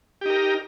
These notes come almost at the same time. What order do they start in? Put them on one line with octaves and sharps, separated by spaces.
G4 D#4 A#4